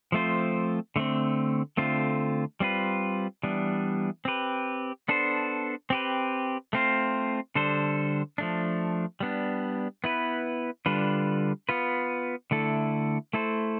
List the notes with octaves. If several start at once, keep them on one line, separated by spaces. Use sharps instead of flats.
F3 A3 C4 F4 C5
D3 A3 C4
D3 A3 C4 F4
G3 C4 F4 B4
E3 G3 B3 D4
C4 G4 B4
B3 D4 A4 C5
C4 G4 B4
A3 C4 F4 C5
D3 G3 D4 A4 C5
F3 A3 D4
G3 B3 D4
B3 E4 B4
D3 G3 D4 F4 B4
B3 F4 B4
D3 A3 E4 A4
A3 E4 A4 C5